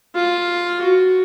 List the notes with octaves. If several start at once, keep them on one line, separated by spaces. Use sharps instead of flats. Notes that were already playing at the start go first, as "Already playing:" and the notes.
F4
F#4